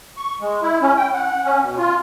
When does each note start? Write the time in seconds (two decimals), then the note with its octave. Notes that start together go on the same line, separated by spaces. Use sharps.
0.17 C#6
0.41 G#3
0.62 E4
0.81 C#4
0.97 G5
1.14 F#5
1.44 C#4
1.61 B2
1.78 F4